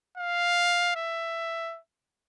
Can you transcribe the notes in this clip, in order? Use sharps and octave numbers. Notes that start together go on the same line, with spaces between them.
F5
E5